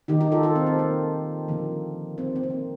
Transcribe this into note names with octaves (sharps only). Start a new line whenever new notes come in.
D#3 A#3 D#4 G4
D#4 G4
F4 A4
F4 A4
C4
C4
A#3
D3 F3 A#3
C4
C4
A#3
C4